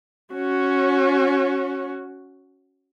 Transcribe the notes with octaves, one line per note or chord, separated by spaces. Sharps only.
C#4 F#4